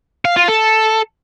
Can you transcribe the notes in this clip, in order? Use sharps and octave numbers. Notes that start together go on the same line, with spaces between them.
F5
F4
A4